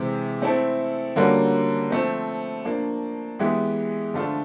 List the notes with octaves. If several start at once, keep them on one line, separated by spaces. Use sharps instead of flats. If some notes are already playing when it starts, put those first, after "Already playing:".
Already playing: C3 E3 G#3 C4
A3 C4 E4 A4
D3 G3 A#3 C#4 F#4
F3 A3 C4
F3 A#3 D4
E3 G#3 B3 E4 G4
D3 F3 A3 D4 F4